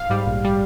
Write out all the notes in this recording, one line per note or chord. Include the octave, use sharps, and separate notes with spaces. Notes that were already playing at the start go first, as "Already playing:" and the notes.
Already playing: F5
G#2 G3
A#1
G3